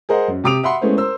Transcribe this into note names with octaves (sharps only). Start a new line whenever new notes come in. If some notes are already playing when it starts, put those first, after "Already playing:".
G#4 A#4 C5 D#5 F#5
F#2
C3 G4 D6 D#6 D7 F7
E5 F#5 B5 C6
G#3 A3 B3 C#4 E4 C5
A#4 C5 E6